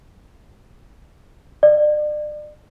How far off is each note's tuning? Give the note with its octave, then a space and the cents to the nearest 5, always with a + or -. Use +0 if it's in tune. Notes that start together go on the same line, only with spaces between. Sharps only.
D5 +35